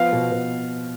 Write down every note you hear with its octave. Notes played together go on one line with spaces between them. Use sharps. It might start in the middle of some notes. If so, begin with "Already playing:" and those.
Already playing: F3 B3 F5
B2
B2